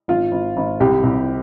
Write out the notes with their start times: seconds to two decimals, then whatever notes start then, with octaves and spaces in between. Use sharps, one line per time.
0.08 G#1 F4
0.32 G#1
0.57 G#1
0.80 C2 G4
1.03 C2